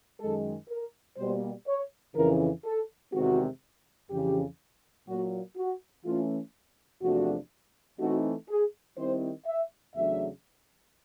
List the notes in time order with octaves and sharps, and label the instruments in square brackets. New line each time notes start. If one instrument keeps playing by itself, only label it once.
[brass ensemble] F#2 D#3 G#3 A4
A#4
B2 G3 A#3 C5
C#5
F2 C#3 E3 A#4
A4
E2 C3 D#3 G#3 C4 F#4
F2 C#3 E3 G4
A#2 F#3 A#3 F#4
F#4
E3 A3 C#4 F4
E2 C3 F3 A3 D4 F#4
E3 A3 C4 D#4 F#4
G#4
D#3 G3 C4 E4 C5
E5
E2 C#3 F#3 A3 D4 E5